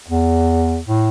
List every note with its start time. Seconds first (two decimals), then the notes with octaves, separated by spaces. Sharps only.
0.08 E2
0.87 A2